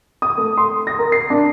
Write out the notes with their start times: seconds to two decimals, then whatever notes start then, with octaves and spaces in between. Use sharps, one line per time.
0.22 D#6
0.38 A3
0.57 C6
0.87 A#6
0.99 A#4
1.12 C7
1.30 D4